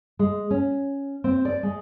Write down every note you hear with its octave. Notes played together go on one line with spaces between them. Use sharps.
G#3
C#4
C4
D5
G#3